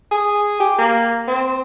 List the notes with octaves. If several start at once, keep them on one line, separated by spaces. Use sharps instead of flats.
G#4
G4
A#3
C4